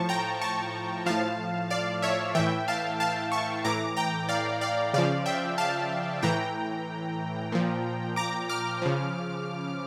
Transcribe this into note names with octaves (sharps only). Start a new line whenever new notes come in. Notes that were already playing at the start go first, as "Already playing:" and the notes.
Already playing: A2 F3 A5 C#6
G5 A#5
A5 C#6
A2 F3 F5 A5
D5 F5
C#5 E5
A2 E3 E5 G5
F5 A5
F5 A5
A5 C#6
A2 E3 A#5 D6
G5 A#5
D5 F5
D5 F5
C#3 F3 D5 F5
E5 G5
F5 A5
A2 E3 G5 A#5
A#2 F3
A#5 D6
D6 F6
C#3 F3